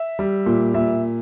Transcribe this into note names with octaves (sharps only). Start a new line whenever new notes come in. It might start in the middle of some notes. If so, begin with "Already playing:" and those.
Already playing: E5
G3
A#2
A#2 E5